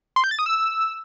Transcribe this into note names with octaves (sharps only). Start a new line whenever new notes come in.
C6
G6
A6
D#6
E6